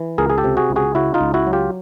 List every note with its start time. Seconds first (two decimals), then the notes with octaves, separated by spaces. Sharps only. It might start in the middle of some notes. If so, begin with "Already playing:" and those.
Already playing: E3
0.18 C#2 G#4 A#4
0.30 G#4
0.38 G4 A4
0.44 C3
0.57 F#4 G#4
0.70 C#2
0.76 F#4 G#4
0.95 C#3 E4 F#4
1.14 D#4 F4
1.21 C#2
1.34 E4 F#4
1.47 F#3
1.53 F4 G4